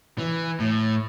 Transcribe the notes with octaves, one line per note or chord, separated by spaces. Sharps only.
E3
A2